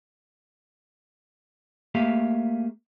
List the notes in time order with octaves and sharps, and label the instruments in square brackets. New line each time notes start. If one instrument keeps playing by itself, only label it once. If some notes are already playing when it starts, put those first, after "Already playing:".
[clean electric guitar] A3 A#3 G4 G#4 E5 F5